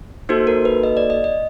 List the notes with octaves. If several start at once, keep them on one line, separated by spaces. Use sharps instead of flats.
A#3 D#4 F#4 A4 C5
A#4
B4
D#5
D5
D#5
D#5